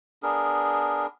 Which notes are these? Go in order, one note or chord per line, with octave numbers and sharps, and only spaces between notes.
B3 D4 G#4 A#4